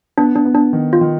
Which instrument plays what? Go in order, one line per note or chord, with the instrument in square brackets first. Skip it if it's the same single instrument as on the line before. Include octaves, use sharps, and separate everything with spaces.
[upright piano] B3 [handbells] D4
[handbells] D4
[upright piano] B3
[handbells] D4
[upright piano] D#3
[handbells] F4
[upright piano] D#3